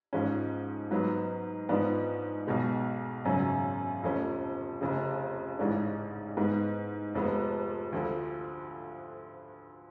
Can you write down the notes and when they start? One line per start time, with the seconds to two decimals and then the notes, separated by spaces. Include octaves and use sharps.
0.13 G#2 F3 G#3 C#4
0.91 G#2 F#3 B3
1.69 G#2 F3 B3 D4
2.47 B1 B2 G#3
3.25 G#1 F#2 C#3 F#3 C#4
4.03 F1 F2 F3 A3 C#4
4.81 F1 F2 C#3
5.59 A1 G#2 G#3 D4
6.37 G#2 G#3 B3
7.15 F1 F2 F3 G#3 B3
7.93 D2 D3 F3